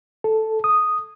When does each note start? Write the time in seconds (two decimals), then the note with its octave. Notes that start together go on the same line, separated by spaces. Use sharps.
0.24 A4
0.64 D#6